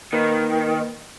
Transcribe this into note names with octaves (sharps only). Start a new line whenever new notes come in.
D#3 A#3 A#4 B4